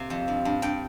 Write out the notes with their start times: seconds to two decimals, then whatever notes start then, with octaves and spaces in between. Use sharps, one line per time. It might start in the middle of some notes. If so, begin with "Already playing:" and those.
Already playing: C3 A#3
0.10 F2
0.28 G2
0.45 G2
0.62 G2 G5